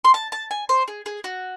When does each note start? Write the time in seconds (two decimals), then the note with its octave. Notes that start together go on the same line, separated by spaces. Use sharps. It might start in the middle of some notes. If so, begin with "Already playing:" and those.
0.05 C6
0.14 A5
0.32 A5
0.51 G#5
0.69 C5
0.88 G#4
1.06 G#4
1.24 F#4